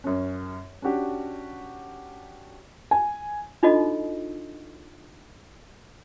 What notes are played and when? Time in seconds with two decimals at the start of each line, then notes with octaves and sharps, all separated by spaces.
0.04 F#2 C#4
0.82 C#4 D4 F#4 G4
2.91 G#5
3.63 D4 D#4 F4 F#4 A4 D#5